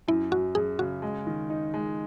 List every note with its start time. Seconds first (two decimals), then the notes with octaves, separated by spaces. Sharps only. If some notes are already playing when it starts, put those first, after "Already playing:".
0.08 F#2 E4
0.31 F#2 F#4
0.55 F#2 G#4
0.79 C#3 F#4
1.02 G#3
1.27 D#3
1.50 D#4
1.74 G#3